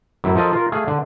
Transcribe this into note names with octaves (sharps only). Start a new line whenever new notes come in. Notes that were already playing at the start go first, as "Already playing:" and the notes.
F#2 A2 E4
F3 A4 A#4 D#5 F5
F4 A#4
A3 G#4 F5
D3